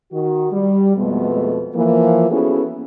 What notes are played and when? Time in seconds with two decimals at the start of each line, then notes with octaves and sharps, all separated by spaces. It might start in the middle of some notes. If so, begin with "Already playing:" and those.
0.12 D#3 F#4
0.52 G3
0.97 F2 B2 G#3 A3 B3
1.75 E3 F3 A#3
2.30 B3 C#4 E4 F#4 G#4 A4